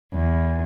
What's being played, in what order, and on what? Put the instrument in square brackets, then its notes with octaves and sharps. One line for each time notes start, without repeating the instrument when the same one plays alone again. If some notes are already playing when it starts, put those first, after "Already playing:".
[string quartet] E2